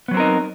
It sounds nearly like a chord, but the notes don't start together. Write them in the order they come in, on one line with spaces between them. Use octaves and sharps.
B3 F#3 C4 A#4 D#4